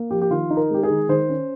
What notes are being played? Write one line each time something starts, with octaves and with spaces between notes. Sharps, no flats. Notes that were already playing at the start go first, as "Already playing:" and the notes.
Already playing: A#3
F3 G4
G4
D#3 F4
D#4
A#4
G#3 G4
G#4
D#3
D#3 C5
C#4